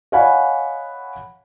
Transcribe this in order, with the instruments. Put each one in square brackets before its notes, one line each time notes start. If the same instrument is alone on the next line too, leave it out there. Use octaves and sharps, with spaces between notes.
[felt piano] C#5 D#5 F5 F#5 G#5 B5